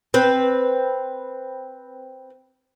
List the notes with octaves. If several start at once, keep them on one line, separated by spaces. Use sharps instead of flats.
C4 B4